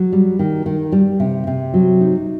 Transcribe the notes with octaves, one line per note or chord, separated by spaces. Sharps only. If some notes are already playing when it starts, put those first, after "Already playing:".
Already playing: F#3
G3
D#3
D#3
G3
C3
C3
F#3
D#4